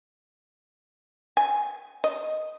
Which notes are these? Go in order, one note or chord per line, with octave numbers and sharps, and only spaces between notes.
G#5
D#5